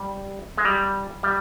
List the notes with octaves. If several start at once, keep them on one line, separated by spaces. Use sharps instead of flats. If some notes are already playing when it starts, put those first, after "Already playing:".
Already playing: G3
G#3
G3
G3